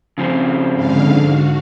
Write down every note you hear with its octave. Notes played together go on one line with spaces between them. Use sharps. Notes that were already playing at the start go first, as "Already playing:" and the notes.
C#3 F3 C4
G#2 D3 F5
F#4